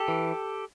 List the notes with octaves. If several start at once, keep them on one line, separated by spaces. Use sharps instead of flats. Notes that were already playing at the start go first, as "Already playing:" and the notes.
Already playing: G4 A4
E3